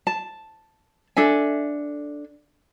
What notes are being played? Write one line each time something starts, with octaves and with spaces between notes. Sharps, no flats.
A5
D4 A4 E5 G#5